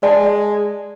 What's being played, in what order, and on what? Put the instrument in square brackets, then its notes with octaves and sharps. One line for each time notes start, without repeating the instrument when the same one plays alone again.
[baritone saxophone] G#3 [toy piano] D5 A5